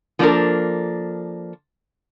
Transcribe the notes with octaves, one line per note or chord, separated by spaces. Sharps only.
F3 A#3 C#4 D4 A4 A#4